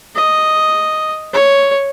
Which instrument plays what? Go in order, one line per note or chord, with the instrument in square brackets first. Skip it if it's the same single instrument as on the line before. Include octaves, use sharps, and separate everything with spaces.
[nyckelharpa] D#5
C#5